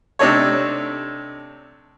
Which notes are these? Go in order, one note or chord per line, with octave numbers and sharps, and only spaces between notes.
C3 A3 D4 D#4 A4 C#5